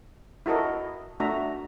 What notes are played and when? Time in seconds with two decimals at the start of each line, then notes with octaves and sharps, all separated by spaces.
0.46 E4 F#4 A4 A#4 D#5
1.20 A3 D4 F#4 E5 A#5